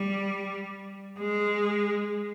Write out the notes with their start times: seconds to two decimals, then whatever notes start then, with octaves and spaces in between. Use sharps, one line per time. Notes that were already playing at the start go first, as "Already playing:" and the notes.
Already playing: G3
1.19 G#3